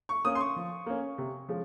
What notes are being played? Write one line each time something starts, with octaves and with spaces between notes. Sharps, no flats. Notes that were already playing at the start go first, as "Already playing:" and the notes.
C#6
A#3 C#4 D#6
C6
C#6
F3
A#3 C#4
C3
F3 G#3 C#4